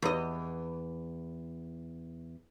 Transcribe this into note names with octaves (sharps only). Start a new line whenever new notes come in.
E2 D#5